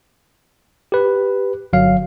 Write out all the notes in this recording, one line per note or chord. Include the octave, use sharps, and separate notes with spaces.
G4 B4
G1 F#3 F5